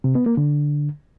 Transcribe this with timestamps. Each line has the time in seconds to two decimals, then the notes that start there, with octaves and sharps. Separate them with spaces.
0.04 C3
0.15 B3
0.26 A#3
0.37 D3